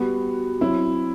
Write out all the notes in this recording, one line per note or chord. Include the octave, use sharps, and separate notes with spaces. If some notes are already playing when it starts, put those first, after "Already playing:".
Already playing: G3 B3 F#4
F#3 C4 E4